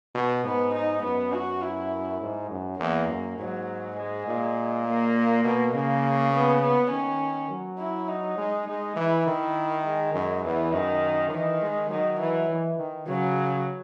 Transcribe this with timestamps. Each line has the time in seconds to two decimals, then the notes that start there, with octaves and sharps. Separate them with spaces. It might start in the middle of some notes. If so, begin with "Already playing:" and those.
0.15 B2
0.44 G#2 B3
0.74 D#4
1.03 F#2 B3
1.33 F#4
1.62 E4
2.21 G#2
2.50 F#2
2.79 E2 A#3
3.08 F#2
3.38 G#2 F#3
3.98 G#3
4.27 A#2
4.86 A#3
5.44 B2
5.73 C#3 A#3
6.33 B3
6.62 B3
6.90 D#3 C#4
7.50 F#3
7.78 E4
8.08 D#4
8.37 G#3
8.67 G#3 D#4
8.96 E3 E4
9.27 D#3
9.85 G#3
10.13 F#2
10.44 E2 E3
10.72 F#2 D#3
11.32 D#3 E3
11.61 G#3
11.90 D#3 F#3
12.20 E3
12.49 E3
12.79 D#3
13.07 C#3 F#3